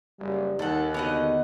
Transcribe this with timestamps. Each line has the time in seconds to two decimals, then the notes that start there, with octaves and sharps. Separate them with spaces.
0.20 F#1 G3
0.59 D#2 D#3 A4 F#5
0.94 D3 B3 F#4 D#5